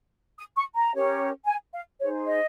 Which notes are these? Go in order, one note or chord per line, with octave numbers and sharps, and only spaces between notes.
D#6
C#6
A#5
C#4 G4 A#4 C#5
G#5
F5
D#4 G#4 C5 C#5
D#5